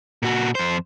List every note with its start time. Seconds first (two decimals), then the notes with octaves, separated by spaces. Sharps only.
0.22 A#2 F#4
0.55 F2 C5